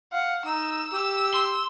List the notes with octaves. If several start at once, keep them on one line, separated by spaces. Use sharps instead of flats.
F5 F#5
D#4 E6
G4 E6
C6